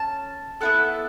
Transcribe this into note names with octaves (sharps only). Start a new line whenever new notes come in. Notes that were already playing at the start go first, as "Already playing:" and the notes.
Already playing: C#4 A5
B3 E4 A4 F#5